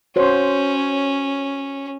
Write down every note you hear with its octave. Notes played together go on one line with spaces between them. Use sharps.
C#4 F#4 C5 C#5